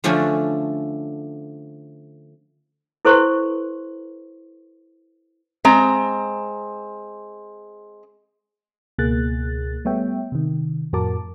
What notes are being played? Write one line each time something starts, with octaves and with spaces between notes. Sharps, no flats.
D3 F3 A3 C#4 D4
E4 A4 B4 C5 C6 C#6
G#3 C4 A#5
C#2 B2 A#3 G#4 F#6 A6
G3 A3 B3 C#5 E5 G5
C3 D#3
F2 A2 F#4 A#4 A5 D6